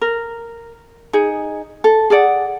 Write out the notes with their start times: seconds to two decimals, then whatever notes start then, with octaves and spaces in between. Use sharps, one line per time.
0.01 A#4
1.13 D#4 G#4
1.84 A4
2.10 G#4 A4 D5 F#5